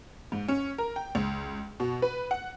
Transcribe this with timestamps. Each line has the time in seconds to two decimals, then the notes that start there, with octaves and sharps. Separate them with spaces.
0.32 G#2
0.48 C#4
0.78 A#4
0.96 G5
1.15 C#2
1.80 B2
2.02 B4
2.31 F#5